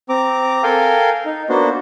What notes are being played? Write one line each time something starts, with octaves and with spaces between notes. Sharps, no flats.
C4 A#5 D6
A4 A#4 F5 G5 G#5
D#4
A#3 B3 D4 F#4 C5